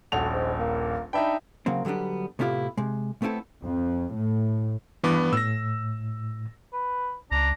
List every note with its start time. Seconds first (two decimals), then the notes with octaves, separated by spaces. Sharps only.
0.12 D#1 A#1 A3 F#4 F7
0.33 G#2
0.59 A#3
1.13 D4 D#4 E5 G5 B5
1.66 C#3 F#3 A#3 C4
1.85 D3 F#3 G3 B3 D4
2.39 A2 C3 B3 E4 F4 G4
2.77 C3 G#3
3.22 A3 B3 C4 E4 A4
3.64 F2
4.15 A2
5.04 G2 E3 B3 D6
5.33 A2 E6 A#6
6.73 B4
7.32 C#2 D4 A#5